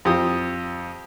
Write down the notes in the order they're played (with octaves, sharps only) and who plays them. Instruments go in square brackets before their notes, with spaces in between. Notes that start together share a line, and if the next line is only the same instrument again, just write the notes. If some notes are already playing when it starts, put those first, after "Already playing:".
[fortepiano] F2 G4 D#6